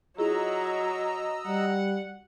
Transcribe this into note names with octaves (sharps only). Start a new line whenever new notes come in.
F#3 E4 F4 G#4 D#5 A#5 E6
G3 F#5